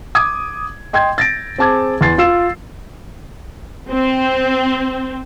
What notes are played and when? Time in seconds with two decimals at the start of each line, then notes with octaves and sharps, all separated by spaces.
0.15 D6 D#6 G#6
0.93 D#5 G5 C6 G6 G#6
1.18 A6 A#6 D7
1.58 C4 G#4 A5 D6 G#6
2.01 E2 C6 A6 C7
2.18 F4 E6 C7 E7
3.91 C4